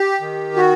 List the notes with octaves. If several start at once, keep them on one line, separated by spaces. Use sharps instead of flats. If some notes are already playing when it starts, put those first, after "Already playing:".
Already playing: G4
D#3
F#4